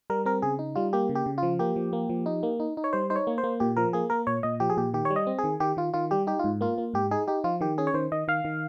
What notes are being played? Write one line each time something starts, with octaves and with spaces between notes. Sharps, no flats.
G3 A#4
C4 A#4
C#3 G#4
D#4
G3 F4
A#3 G4
C#3
G4
C#3
F3 F4
A#3 G4
F3
A#3
F3
D#4
A#3
D#4
D#4
C#5
G3 C5
D#4 C5
C#5
A#3
C5
A#3
A#2 G4
F3 A#4
A#3 G#4
A#3 A#4
A#2 C#5
A#2 D#5
F3 G4
G#4
A#2 G4
D#3 G4
C#5
G3
D#5
C4
G#4
D#3
D#3 G4
D#3 F4
D#3 F4
G3 G4
D#4 G4
G#2 F4
A#3 F4
A#3
G#2 G4
D#4 G#4
D#4 G4
F3 F4
D#3 G4
C#4 G#4
C#5
D#3 C5
D#3 D#5
D#3 F5
D#3